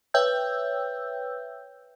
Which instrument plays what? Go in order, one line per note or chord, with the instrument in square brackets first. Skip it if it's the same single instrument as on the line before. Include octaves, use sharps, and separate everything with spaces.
[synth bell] B4 C#5 E5 G5 E6 G6